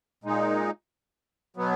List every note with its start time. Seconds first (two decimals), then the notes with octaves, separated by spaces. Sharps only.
0.24 A#2 G#3 D#4
1.57 B2 F#3 B3